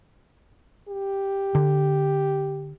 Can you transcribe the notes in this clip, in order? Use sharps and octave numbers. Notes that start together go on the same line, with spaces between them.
G4
D3